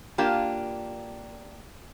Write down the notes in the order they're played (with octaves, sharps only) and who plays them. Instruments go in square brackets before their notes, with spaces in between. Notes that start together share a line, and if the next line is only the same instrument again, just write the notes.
[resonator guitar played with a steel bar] A#3 D4 F4 G4